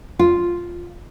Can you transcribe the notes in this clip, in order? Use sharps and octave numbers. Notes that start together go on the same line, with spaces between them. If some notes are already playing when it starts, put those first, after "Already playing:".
F4